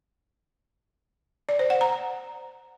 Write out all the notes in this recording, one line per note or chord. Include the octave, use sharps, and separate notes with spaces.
D5
C5
F#5
A#5